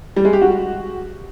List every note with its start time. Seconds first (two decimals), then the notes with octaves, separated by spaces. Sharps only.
0.16 G3
0.25 G#3
0.33 G4
0.41 F#4